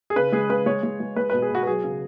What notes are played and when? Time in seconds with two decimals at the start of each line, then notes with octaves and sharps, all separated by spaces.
0.10 G#4
0.16 C#3 B4
0.32 G#3 G#4
0.49 C#3 B4
0.66 G#3 C#5
0.83 G#3
1.00 G#3
1.16 G#3 B4
1.30 B2 B4
1.42 G#4
1.51 B2 F#4
1.63 B4
1.67 F#3 G#4
1.84 C#3